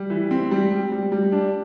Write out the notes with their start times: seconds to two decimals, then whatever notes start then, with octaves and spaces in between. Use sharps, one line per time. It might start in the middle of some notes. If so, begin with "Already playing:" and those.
Already playing: G3
0.10 E3
0.31 C4
0.51 G3
0.72 G3
0.92 G3
1.12 G3
1.32 D4